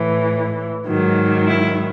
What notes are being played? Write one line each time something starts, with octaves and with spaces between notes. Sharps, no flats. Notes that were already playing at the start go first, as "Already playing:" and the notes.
Already playing: A2 E3
G#2 D#3 F#3
E4